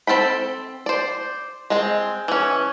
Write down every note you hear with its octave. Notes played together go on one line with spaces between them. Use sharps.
C4 A4 G5 B5
C5 D5
G#3 C4
E3 C#4